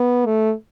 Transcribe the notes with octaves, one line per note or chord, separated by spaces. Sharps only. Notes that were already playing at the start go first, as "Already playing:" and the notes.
Already playing: B3
A3